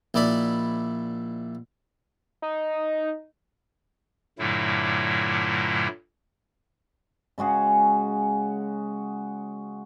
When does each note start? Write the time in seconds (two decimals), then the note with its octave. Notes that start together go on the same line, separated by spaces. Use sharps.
0.14 A#1 D#4 E4 D5 B5
2.42 D#4
4.39 G2 A#2 D3 F#3 A3 E4
7.38 C#3 G#3 F#4 G#4